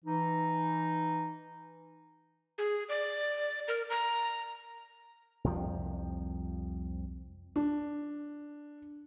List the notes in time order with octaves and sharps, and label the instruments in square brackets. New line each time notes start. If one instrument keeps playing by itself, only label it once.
[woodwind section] E3 D#4
[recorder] G#4
D5
A#4
A#5
[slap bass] C2 F2 C3 F3
[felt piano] D4